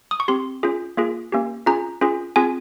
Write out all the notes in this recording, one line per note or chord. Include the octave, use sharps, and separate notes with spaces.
D#6
C#6
C4 G4 C6
C#4 F4 G#4
A#3 F4 G#4
A#3 C#4 G4
C#4 F4 G#4 A#5
C#4 F4 G#4
C4 F4 G#4 G#5